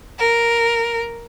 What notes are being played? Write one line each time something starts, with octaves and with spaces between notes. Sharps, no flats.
A#4